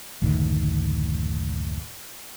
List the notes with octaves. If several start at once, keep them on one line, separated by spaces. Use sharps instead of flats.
F#1 D2 A2 D#3